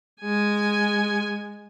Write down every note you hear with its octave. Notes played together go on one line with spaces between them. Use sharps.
G#3 G#5